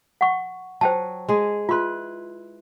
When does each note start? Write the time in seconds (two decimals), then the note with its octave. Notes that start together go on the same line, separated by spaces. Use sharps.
0.21 F#5 C#6
0.81 F#3 C5 G5 A5
1.29 G#3 G#4
1.69 E4 F4 B4 C6